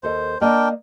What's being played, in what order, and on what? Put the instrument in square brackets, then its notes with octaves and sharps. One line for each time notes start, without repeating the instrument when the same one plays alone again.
[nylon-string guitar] D#2 A4 D#5 [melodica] C5
[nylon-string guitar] A#3 D5 D#5 [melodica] D4 A#4 G5